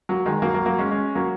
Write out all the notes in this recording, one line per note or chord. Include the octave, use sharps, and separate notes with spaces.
F#3 A#3
D#3 G#3
F#3 A#3
F#3 A#3
F#3 A#3
G#3 C#4
G#3 C#4
F#3 A#3